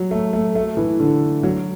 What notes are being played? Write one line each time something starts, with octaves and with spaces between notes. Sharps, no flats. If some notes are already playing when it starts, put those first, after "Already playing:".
Already playing: F#3
A3
A3
A3
E3
D3
F#3